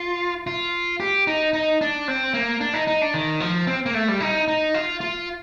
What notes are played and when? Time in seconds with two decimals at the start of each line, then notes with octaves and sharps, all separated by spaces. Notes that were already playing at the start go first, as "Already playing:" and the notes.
Already playing: F4
0.47 F4
1.00 G4
1.27 D#4
1.53 D#4
1.81 D4
2.08 C4
2.34 A#3
2.60 D4
2.74 D#4
2.87 D#4
3.01 D4
3.14 D#3
3.40 F3
3.67 C4
3.86 A#3
3.94 A3
4.08 G3
4.20 D#4
4.48 D#4
4.74 F4
5.01 F4